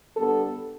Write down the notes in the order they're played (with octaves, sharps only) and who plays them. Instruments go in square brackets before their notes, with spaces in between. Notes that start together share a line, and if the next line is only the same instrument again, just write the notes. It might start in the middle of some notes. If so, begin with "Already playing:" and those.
[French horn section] D3 G3 B3 D4 A4